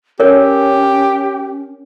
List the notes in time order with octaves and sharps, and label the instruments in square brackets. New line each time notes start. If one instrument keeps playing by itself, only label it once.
[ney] C#4 [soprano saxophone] G4 [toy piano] A#4 C#5